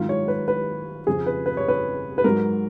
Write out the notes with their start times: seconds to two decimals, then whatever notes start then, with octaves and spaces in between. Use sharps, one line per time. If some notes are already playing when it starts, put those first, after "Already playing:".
Already playing: G#2 D#3 F#3 F4
0.09 C#5
0.28 B4
0.48 B4
1.07 F2 C#3 F3 G#4
1.26 B4
1.46 B4
1.57 C#5
1.68 B4
2.18 B4
2.24 G#2 F#3 A#4